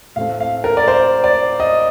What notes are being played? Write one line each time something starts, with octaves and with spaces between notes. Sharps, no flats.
A2 A3 C4 F5
F5
A#4
D5
C5
D5
D#5